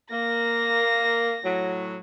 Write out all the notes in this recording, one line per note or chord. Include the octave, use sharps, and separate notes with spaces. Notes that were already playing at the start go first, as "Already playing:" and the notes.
A#3 A#6
A2 F#3